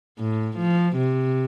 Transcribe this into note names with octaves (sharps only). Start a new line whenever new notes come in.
A2
F3
C3